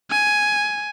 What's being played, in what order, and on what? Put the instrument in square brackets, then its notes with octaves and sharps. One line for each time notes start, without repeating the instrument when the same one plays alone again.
[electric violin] G#5